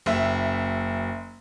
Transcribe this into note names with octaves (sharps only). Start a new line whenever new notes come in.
F#1 E5